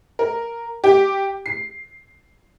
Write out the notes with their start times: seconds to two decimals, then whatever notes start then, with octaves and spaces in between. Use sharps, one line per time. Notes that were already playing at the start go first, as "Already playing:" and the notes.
0.19 A#4
0.84 G4
1.46 C7